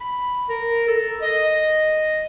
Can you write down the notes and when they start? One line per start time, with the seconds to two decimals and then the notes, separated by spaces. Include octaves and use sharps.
0.01 B5
0.49 A#4
0.88 A4
1.22 D#5